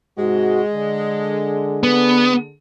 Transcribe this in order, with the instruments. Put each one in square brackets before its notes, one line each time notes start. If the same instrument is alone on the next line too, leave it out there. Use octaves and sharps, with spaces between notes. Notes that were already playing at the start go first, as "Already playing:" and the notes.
[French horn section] G#2 C3 F#4 [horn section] G#3
[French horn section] D3 G#4
[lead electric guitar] B3